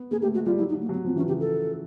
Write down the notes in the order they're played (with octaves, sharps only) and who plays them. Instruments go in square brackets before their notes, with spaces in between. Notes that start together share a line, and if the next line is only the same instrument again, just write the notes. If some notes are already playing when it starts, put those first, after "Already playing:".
Already playing: [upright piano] B3
[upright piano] A#3 [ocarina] G#4
[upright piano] A3 [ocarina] G4
[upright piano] G#3 [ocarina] F#4
[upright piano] G3 [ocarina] F4
[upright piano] F#3 [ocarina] E4
[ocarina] D#4
[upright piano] F#3
[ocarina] A#3
[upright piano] F#3 [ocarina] B3
[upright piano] F3 [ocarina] C4
[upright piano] E3 [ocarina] C#4
[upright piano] C#3 [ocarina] G4
[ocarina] A4